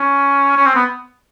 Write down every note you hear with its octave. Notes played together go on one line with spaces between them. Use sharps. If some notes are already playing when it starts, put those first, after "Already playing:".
Already playing: C#4
C#4
C4
B3